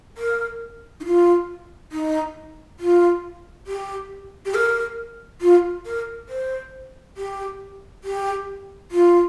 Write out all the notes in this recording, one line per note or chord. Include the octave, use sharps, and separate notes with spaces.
A#4
D#4
F4
D#4
F4
G4
G4
A#4
F4
A#4
C5
G4
G4
F4